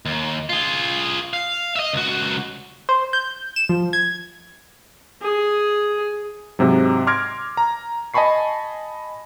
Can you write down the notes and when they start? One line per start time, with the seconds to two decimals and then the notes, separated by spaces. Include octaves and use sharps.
0.06 D#2
0.49 F4 G#4
1.33 F5
1.76 D#5 E5
1.93 C#2 F#4
2.89 C5
3.13 G6
3.56 E7
3.69 F3
3.93 G#6
5.22 G#4
6.59 G#2 C3 F#3
7.07 C6 D6 F6 G#6 A#6 D7
7.57 A#5
8.14 D#5 G#5 A5 B5 C#6 C7